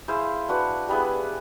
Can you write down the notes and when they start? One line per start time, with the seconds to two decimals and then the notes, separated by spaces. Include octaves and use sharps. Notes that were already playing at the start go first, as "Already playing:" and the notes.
0.08 E4 G#4 C5 F5
0.49 D4 F#4 B4
0.88 G3 B3 E4 G#4